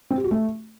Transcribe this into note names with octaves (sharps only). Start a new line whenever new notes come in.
C4
G4
F#4
A3